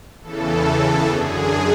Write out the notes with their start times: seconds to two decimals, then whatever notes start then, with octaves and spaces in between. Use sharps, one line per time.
0.22 E2 C#3 E3 A4
1.08 F#2 D3 G#4